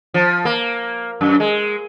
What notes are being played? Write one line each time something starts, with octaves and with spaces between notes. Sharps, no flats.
F3
A#3
F#2
G#3